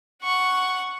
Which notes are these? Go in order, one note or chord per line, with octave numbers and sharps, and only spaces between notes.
F#5 C#6